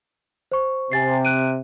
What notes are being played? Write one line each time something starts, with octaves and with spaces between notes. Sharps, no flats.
C5 C#6
C3 G#5 A6 C7
F#6 D7 D#7